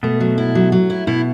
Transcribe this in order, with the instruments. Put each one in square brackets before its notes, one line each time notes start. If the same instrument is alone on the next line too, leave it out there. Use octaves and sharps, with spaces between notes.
[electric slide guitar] B2 [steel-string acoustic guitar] A3
[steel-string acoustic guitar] F#3
E4
F#3
F#3
E4
[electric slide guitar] B2 [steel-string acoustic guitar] E4